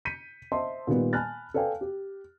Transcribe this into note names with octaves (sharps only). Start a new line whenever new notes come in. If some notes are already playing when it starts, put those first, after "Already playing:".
G6 B6 C#7 D#7
C5 D#5 E5 A5 C6
A#2 D#3 G3 B3
G#5 A5 B5 F6 F#6 A6
A4 B4 D5 F5 G5 G#5
G4